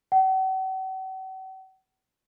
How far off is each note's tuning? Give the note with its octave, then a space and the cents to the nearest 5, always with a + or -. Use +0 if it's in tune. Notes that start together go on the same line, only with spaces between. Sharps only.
F#5 +45